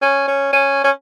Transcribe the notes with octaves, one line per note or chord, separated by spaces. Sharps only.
C#4
C#4
C#4
C#4